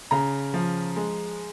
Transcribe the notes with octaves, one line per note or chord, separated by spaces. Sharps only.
C#3 A#5
F3
G#3